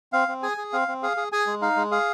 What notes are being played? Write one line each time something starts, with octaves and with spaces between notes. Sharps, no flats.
C4 F5
C4
G#4 G#5
G#4
C4 F5
C4
G#4 F5
G#4
G#4 G#5
G#3
D#4 F5
G#3
G#4 F5